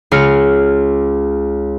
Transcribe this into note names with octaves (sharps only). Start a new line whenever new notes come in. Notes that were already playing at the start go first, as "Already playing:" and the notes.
C#2 G#4 F6 A#6 C#7